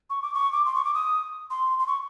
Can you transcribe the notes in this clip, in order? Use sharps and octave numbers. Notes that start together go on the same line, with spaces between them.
C#6
D6
C#6
D6
C6
C#6
D6
D#6
C6
C6
C#6